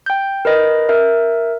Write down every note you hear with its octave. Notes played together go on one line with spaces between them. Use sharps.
G5 G6
A#4 B4 D#5
A#4 E5